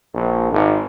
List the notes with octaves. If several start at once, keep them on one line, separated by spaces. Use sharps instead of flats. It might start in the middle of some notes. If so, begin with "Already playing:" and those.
A#1
G#1